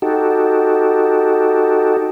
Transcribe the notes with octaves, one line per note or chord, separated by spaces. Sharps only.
D#4 F#4 G4 A4